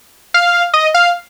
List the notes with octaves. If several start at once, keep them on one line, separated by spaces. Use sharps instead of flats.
F5
D#5
F5